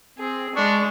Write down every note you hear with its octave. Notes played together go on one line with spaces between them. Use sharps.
C4 G#4
G#3 D4 C#6